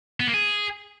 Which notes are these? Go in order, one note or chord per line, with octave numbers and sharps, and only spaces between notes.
B3
A#3
G#4